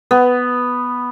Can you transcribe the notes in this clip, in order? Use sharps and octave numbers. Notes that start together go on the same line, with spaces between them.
B3